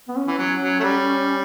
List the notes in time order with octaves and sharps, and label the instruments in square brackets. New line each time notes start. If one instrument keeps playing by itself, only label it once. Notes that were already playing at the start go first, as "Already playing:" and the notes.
[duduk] B3
C#4
[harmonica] E3
F#3
F#3
A3
G3